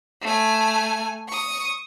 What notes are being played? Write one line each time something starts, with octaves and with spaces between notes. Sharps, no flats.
A3 G#5
C#6 D#6